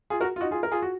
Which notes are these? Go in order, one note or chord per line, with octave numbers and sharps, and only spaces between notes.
F4 G#4
F#4 A#4
F4
D#4 F#4
F4 G#4
A#4
F4 G#4
F#4